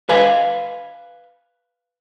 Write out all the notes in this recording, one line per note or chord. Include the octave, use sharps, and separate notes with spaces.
B4 F5 G#5